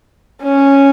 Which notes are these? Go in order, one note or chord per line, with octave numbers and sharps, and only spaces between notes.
C#4